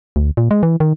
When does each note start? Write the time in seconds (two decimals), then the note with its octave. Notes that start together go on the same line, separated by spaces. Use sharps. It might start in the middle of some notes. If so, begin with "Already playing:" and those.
0.16 D2
0.37 A#2
0.51 G#3
0.63 E3
0.80 D#3